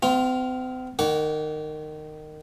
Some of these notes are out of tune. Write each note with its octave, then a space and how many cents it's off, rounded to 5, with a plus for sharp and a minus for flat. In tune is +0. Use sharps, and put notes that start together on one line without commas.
C4 -45 F4 +0
D#3 -20 F#5 +0 D6 -35